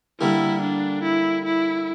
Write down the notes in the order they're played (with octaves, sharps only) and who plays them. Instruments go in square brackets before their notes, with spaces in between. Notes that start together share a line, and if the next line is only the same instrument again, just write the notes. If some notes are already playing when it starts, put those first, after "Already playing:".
[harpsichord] D3 G3 A#3 [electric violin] E4
[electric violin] D4
E4
E4